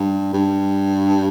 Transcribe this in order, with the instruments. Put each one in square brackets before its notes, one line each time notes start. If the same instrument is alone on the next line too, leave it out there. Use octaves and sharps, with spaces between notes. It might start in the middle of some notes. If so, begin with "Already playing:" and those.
Already playing: [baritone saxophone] G2
G2